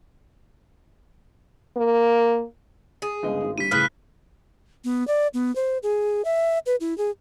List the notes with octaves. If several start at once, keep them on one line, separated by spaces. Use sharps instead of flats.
A#3
G#4
G1 C#2 D#5
G#1
D3 G3 B6 D#7
A2 C#3 F3 B4 F6 F#6 B6
B3
D5
B3
C5
G#4
E5
B4
E4
G#4